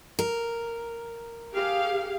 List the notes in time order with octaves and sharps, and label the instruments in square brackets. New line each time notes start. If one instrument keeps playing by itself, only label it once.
[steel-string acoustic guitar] A#4
[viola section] G4 G#4 F5